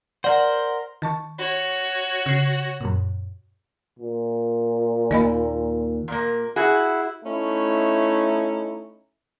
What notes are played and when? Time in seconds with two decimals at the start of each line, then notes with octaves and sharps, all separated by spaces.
0.24 A#4 C5 D5 F#5
1.02 D#3 A5 C#6
1.38 F#4 C#5
2.26 C#3 C7
2.81 F#2 A#2
3.99 A#2
5.11 D#2 A#3 D#5 B5
6.08 A#2 A#3
6.56 E4 F#4 G#4
7.24 A3 C#4 D#4 E4